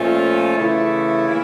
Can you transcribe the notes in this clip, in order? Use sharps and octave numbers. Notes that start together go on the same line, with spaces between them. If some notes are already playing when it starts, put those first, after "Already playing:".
Already playing: A#2 F3 A3 C#4 F4
C#3 E3 A3 E4
E3 A#3 E4